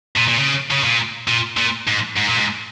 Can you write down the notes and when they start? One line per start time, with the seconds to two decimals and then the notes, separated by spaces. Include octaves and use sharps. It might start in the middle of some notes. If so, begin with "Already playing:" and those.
0.17 A#2
0.28 A#2
0.39 C#3
0.71 C#3
0.84 A#2
1.28 A#2
1.57 A#2
1.87 G#2
2.16 G#2
2.26 A#2
2.36 G#2